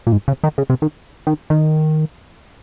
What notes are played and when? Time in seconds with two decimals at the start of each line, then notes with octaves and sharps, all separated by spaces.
0.07 A#2
0.12 G#2
0.28 C#3
0.44 D#3
0.58 C#3
0.70 C3
0.82 D#3
1.27 D#3
1.50 D#3